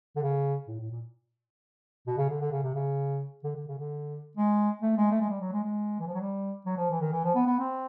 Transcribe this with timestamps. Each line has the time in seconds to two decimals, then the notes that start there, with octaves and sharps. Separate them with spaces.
0.16 D3
0.23 C#3
0.68 A2
0.80 A2
0.91 A#2
2.07 B2
2.18 C#3
2.30 D3
2.40 D3
2.52 C#3
2.63 C3
2.75 C#3
3.44 D3
3.56 D3
3.68 C#3
3.78 D3
4.37 G#3
4.82 A3
4.98 G#3
5.11 A3
5.21 G#3
5.29 G3
5.41 F#3
5.52 G#3
5.64 G#3
6.00 E3
6.07 F3
6.14 F#3
6.20 G3
6.66 F#3
6.78 F3
6.90 E3
7.01 D#3
7.12 E3
7.24 F3
7.35 B3
7.47 B3
7.59 C4